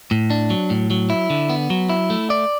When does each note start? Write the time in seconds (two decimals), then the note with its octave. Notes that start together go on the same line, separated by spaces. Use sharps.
0.11 A2
0.30 D4
0.50 F#3
0.70 A2
0.90 F#3
1.10 E4
1.30 D3
1.49 B3
1.70 F#3
1.89 E4
2.10 A3
2.30 D5